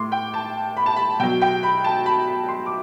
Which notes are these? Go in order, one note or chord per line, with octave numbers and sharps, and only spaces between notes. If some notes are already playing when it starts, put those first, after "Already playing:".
Already playing: A2 C6 D6
G5
A5
B5
A5
B5
B2 F#3 G5
G5
B5
A5
B5
B5
C6
D6